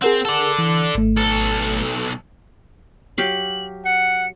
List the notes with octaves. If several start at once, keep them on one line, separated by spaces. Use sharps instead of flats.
C4 G#4 A#4 F#5
A4 D5
E3
G#1 A3
B1 A4
F#3 G4 F5 F#7
F#5 C#7